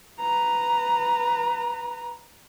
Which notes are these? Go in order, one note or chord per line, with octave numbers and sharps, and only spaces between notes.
B4 A#5